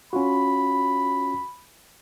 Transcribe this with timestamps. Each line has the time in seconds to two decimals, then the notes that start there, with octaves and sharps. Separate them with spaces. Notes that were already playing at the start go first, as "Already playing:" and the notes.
0.13 C#4 F4 F#4 B5